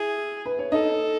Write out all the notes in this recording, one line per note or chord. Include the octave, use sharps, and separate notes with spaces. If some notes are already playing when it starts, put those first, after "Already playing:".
Already playing: E4 G#4
B4
C#5
D#4 A4 D#5